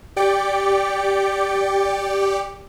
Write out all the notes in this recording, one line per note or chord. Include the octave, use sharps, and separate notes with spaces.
G4 D5 G5 D6 C#7